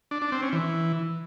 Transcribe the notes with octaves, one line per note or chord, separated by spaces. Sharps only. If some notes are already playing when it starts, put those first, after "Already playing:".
D4
D4
C4
C#4
E3